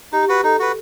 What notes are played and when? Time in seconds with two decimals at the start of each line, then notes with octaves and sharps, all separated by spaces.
0.12 D#4 G4
0.23 G4
0.29 F#4 B4
0.44 D#4 A4
0.60 F#4 B4